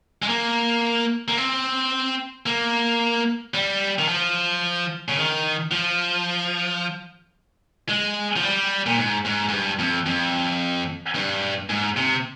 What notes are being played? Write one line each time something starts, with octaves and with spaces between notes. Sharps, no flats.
G#3
A#3
A#3
C4
A#3
G3
D#3
F3
C#3
D#3
F3
G#3
F3
G3
A#2
G#2
G#2
G#2
G2
F2
F2
G2
G#2
C3